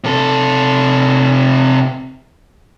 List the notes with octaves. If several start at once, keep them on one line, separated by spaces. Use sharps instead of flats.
C3 A4